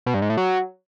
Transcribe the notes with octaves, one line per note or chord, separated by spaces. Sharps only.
B2
G2
G#2
A2
F#3